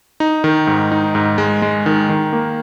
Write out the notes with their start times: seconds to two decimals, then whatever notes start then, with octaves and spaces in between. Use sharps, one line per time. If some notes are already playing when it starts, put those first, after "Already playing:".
0.20 D#4
0.44 D#3
0.67 G#2
0.92 D#4
1.15 G#2
1.38 G#3
1.62 G#3
1.86 D#3
2.09 D#3
2.33 A#3